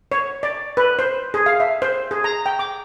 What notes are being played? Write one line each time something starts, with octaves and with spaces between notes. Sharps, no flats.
C#5
D5
B4
C5
G#4
F5
E5
C5
G#4
A#5
G5
D6